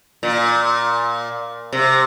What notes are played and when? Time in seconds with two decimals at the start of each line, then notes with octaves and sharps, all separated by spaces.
0.23 A#2
1.73 C3